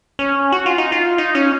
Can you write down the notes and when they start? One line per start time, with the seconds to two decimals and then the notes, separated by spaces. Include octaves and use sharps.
0.19 C#4
0.52 F#4
0.66 F4
0.78 D#4
0.92 F4
1.18 D#4
1.35 C#4